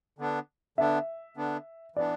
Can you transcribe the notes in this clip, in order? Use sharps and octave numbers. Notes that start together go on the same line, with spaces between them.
D3 B3 D4
D3 B3 D4 E5
D3 B3 D4
E3 B3 D4 D5